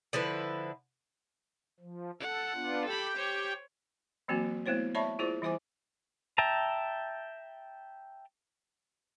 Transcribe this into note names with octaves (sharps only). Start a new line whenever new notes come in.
D3 F3 E4 B4
F3
A4 F#5
B3 D4 F4
G4 A4 G5 B5
C5 C#5
E3 F#3 A#3 C4 F#4
A3 B3 E4 C5 C#5
C#5 D5 E5 A5 B5 C#6
E4 F4 G#4 C5 D5
E3 G3 E4 C5 G#5 D6
E5 G5 A5 A#5